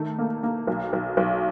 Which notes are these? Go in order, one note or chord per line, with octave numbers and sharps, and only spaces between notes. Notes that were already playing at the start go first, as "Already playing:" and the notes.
Already playing: D#3 A3
A#3
A#3
B1
B1
B1